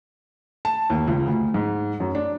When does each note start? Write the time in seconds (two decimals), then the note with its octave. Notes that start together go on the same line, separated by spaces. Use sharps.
0.65 A5
0.90 D#2
1.08 C#2
1.26 D2
1.54 G#2
2.00 F#2
2.15 D4